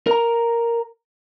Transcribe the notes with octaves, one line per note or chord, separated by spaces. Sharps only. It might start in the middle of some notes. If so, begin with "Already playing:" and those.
A#4 A#5